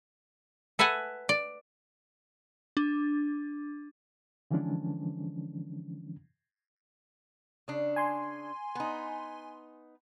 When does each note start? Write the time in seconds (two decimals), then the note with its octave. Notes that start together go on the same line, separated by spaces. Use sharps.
0.79 A4 B4 E5 F#5 G#5
1.29 D5
2.77 D4
4.51 D3 E3 F3 G#3 C#4 D4
7.68 C#3 D4
7.96 G#5 C6
8.75 B3 D#4